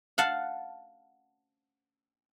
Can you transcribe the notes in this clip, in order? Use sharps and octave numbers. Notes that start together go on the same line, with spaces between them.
F5 F#5 A5